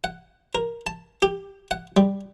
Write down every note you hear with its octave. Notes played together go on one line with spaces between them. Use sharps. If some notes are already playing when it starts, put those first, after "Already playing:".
F#5
A#4
A5
G4
F#5
G3